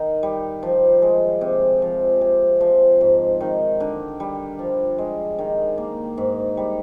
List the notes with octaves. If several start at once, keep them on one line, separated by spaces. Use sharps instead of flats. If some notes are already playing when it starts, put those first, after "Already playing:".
Already playing: D#3
G3
F3
G#3
C3
F3
C3
F3
G#2
D#3
D3
G3
F3
G#3
D#3
A#3
G#2
G3